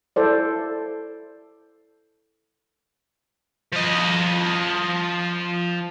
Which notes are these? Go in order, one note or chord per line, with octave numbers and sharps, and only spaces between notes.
E4 A4 C5 D5
F3 D#5